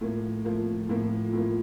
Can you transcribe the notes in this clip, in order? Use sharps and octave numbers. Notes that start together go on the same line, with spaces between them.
A2 F3 A#3
A2 F3 A#3
A2 F3 A#3
A2 F3 A#3